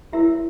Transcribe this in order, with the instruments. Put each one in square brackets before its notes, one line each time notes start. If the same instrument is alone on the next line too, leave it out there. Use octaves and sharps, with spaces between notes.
[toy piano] E4 F#4 A#4 C#5 E5